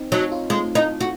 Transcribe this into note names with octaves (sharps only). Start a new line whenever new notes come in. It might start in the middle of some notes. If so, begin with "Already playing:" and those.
Already playing: C4 D#4
F#3 D#4
F4
G#3 F4
D#4
F#4